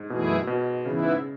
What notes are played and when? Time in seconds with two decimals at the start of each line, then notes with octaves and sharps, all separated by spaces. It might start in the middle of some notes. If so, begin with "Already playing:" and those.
Already playing: G#2
0.09 F#2 B2 E3 A3 E4 G#4
0.47 B2
0.86 G#2 C#3 E3 B3 E4